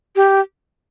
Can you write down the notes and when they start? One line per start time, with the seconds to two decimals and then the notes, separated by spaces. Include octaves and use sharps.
0.16 G4